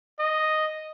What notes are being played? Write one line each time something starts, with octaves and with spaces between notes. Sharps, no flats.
D#5